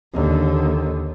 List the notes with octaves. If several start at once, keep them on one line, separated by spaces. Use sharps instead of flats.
D#2 D3